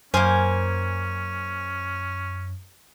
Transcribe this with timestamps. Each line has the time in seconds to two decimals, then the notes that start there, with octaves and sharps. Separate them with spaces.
0.14 F#2 A#3 C#4 C5 G#5 F6